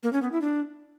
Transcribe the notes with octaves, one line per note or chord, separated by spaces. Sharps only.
A#3
C#4
B3
E4
D4